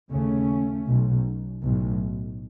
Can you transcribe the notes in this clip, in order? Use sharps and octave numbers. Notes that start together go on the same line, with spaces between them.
D#2 C#3 A3 C#4
B1 B2
B1 A2